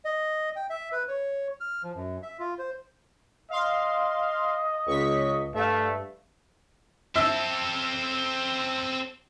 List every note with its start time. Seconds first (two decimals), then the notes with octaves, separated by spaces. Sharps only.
0.05 D#5
0.56 G5
0.70 E5
0.92 B4
1.08 C#5
1.60 F6
1.83 F3
1.95 F#2
2.23 E5
2.39 F4
2.59 C5
3.50 D#5 F5 C6
4.87 C#2 C#6 B6
5.54 G2 A3 E5 F5
7.16 C4 A4 E5 E6